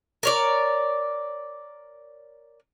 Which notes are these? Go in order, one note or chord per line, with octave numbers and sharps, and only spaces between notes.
A#4 C#5 D5